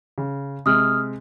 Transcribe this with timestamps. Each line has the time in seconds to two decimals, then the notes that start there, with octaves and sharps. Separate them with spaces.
0.18 C#3
0.66 C3 G#3 D#6 F6